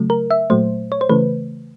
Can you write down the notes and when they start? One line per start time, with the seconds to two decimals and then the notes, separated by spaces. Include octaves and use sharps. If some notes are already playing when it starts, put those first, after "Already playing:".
Already playing: C#3 F#3 A3
0.10 A#4
0.31 E5
0.50 A#2 F#3 A3 C5
0.92 C#5
1.01 C5
1.09 C#3 E3 A3 B4